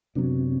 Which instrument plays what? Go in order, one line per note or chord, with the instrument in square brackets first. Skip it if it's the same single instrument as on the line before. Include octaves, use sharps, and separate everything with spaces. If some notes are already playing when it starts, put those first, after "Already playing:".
[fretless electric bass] F#2 F#3 B3 D4 [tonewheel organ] C3